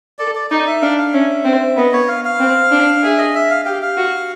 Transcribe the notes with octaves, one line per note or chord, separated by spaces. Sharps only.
A4 D5
D5
D#4 D5
E5
D4 F5
F5
C#4 E5
C4
B3 D#5
C#5
F5
F5
C4
D4
G#4 E5
D#5
E5
F5
G4 F5
F5
F#4